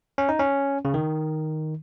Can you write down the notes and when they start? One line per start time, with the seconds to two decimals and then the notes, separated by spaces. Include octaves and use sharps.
0.18 C#4
0.29 D#4
0.39 C#4
0.85 C#3
0.94 D#3